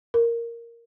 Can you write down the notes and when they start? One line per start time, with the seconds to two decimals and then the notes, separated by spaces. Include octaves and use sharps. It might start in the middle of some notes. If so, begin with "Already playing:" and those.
0.14 A#4